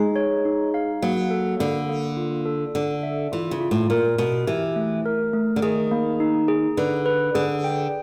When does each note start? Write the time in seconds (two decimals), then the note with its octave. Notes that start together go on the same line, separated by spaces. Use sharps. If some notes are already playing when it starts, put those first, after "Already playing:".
Already playing: G#3 D#4
0.16 C#5
0.45 D#4
0.74 F5
1.02 F#3 A#3
1.31 A4
1.60 D3 A#3
1.89 A#3
2.17 F4
2.46 A4
2.75 D3 A4
3.03 E5
3.32 E3 F4
3.51 C#3
3.61 F4
3.71 A2
3.90 A#2 A#4
4.18 B2 A#4
4.47 E3 G4
4.76 A3
5.06 A#4
5.33 A3
5.56 D3
5.62 D#3 G#4
5.91 A#3
6.20 D#4
6.48 G#4
6.77 D3 B4
7.06 B4
7.35 D3 G#4
7.64 G5